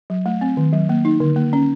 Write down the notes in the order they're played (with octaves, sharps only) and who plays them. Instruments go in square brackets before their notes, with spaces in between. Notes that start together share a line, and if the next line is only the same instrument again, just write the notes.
[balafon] F#3
A3
C4
D#3
F#3
A#3
D#4
D3
A#3
C#4